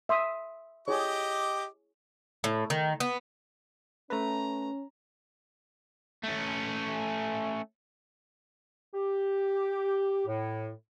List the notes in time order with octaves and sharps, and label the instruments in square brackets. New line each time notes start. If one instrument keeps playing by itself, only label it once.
[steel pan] E5 C6 D#6
[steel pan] E4 G#4 C#5 [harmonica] G4 D#5 D6
[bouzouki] A2
D#3
B3
[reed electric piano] A3 B4 [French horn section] C#4 [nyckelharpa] A#5
[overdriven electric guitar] A3 C#4
[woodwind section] G4
A2